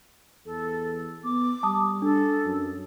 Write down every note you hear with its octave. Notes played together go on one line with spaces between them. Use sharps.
E2 A4
B3 D6
G3 A5 D#6
D4 A4
F#2